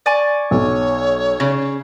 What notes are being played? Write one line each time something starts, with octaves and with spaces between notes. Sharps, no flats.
D5 G#5 C#6
B1 C#5
C#3